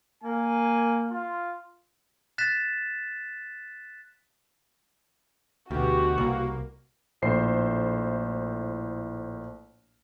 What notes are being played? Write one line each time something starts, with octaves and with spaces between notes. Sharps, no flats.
A#3 G#5
F4
F#6 A6 B6 E7
D2 B2 F#4 G4
C2 A#3
A#1 A2 E4 C5 C7